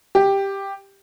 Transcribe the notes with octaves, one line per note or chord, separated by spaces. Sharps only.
G4